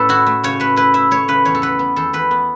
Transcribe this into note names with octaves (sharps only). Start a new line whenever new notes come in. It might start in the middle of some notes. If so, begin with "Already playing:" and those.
Already playing: A2 A3 C#4 A4 B4
E4 F#4
A3
C#3 C#5
A3 B4
E4 B4
E4 E5
A3 C#5
C#3 B4
E2 C#5
A4
B3 B4
B3
E2 A4
E2 B4
B3